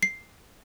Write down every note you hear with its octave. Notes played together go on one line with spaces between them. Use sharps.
C7